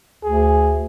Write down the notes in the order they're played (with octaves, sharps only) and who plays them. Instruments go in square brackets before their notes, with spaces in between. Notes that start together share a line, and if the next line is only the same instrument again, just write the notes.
[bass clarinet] D2 [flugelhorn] G#4